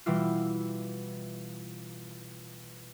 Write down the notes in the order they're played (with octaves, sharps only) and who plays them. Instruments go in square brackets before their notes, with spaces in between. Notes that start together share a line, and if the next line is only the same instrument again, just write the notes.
[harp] B2 E3 G3 E4 F4